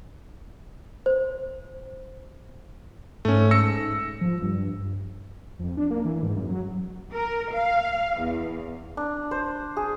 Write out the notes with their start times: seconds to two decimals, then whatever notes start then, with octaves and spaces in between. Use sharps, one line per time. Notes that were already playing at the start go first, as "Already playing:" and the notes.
1.06 C5
3.25 G#2 A3 C#4
3.51 E6 A#6 C#7
4.21 F3
4.42 G2
5.59 F2
5.77 D4
5.91 A#3
6.05 E3
6.23 G#2
6.36 F#2
6.49 F#3
7.13 A#4
7.53 F5
8.20 E2
8.97 D4
9.31 C5
9.77 G#4